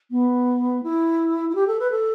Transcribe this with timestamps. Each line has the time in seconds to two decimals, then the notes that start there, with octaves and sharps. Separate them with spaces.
0.10 B3
0.83 E4
1.49 E4
1.55 G4
1.67 A4
1.79 B4
1.90 A4